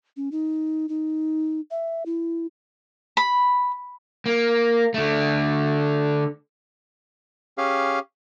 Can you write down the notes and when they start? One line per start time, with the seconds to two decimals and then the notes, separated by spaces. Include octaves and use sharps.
0.17 C#4
0.32 D#4
0.89 D#4
1.71 E5
2.06 E4
3.17 B5
4.26 A#3
4.94 D3 A3
7.58 C#4 G4 G#4 F5